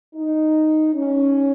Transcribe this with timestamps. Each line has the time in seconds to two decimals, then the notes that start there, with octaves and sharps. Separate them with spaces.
0.15 D#4
0.94 C#4